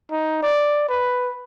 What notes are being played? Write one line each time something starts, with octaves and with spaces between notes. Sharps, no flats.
D#4
D5
B4